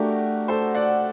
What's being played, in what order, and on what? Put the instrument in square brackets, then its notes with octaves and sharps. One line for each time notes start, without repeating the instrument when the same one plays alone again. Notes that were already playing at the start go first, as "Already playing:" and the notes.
Already playing: [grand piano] A3 D4 F#4 [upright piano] G4 A#4
[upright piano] A4 C5
D5 F#5